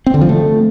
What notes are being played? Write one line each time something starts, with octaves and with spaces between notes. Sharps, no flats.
C4
D3
F3
A3